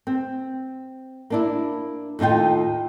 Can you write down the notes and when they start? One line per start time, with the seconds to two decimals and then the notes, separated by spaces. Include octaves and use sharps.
0.07 C4
1.30 A#3 D4 E4
2.19 D#2 A2 D#4 F4 G5